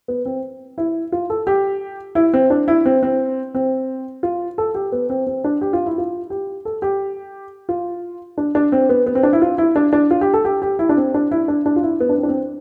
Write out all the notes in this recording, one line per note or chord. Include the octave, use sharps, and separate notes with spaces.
B3
C4
E4
F4
A4
G4
E4
C4
D4
E4
C4
C4
C4
F4
A4
G4
B3
C4
C4
D4
G4
F4
E4
F4
G4
A4
G4
F4
D4
D4
C4
B3
B3
C4
D4
E4
F4
E4
D4
D4
F4
G4
A4
G4
G4
E4
D4
C4
D4
E4
D4
D4
F4
E4
B3
D4
C4
D4
C4